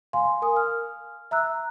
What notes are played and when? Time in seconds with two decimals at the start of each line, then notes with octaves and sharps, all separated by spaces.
0.13 F5 G#5 C6
0.42 A#4 G#5 D#6
0.56 F6
1.31 E5 A#5 E6 F#6